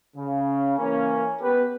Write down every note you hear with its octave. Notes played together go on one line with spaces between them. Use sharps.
C#3
E3 A#3 C#4
B3 G4 B4